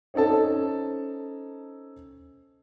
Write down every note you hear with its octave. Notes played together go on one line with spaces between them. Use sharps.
C4 C#4 D#4 A4 A5